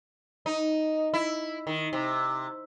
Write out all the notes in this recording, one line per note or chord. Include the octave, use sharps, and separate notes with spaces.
D#4
E4
D#3
C3